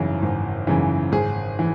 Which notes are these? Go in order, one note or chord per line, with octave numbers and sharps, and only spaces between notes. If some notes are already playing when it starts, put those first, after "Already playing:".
Already playing: G#1 F#2 C#3 E3
G#1
F#2 C#3 E3
G#1 G#4
E3